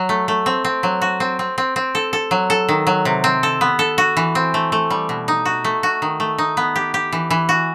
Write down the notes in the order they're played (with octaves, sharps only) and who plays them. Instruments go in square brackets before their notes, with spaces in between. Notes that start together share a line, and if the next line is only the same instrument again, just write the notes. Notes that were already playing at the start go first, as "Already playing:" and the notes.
Already playing: [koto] F#3
A3
A3
C4
C4
F#3
F#4
C4
C4
C4
C4
A4
A4
F#3
A4
D#3
F#3
C3
C4
A4
B3
A4
F#4
E3
C4
A3
A3
G3
B2
D#4
F#4
A3
F#4
D#3
A3
D#4
B3
G4
G4
E3
E3
F#4